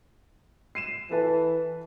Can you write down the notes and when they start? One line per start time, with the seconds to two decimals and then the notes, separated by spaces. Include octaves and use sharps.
0.75 C7 D#7 E7
1.11 E3 A4 B4 A5